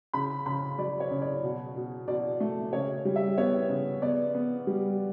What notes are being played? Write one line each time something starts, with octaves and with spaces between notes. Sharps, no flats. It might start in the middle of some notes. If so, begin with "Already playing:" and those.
C#3 B5
C#3 B5
F#3 D5
C#5
C#3
D5
B2
B2
B2 D5
A3
C#3 C#5
G3
E5
B3 C#5
C#3
B3 D5
B3
G3